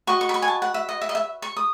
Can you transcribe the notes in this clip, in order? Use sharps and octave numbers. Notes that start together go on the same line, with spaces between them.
F#4 B4 D#5 C#6
C#6
B5
C#6
G#5
A5
F#5
E5
D#5
E5
D#5
E5
C#6
D#6